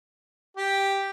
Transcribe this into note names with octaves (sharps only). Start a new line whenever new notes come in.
G4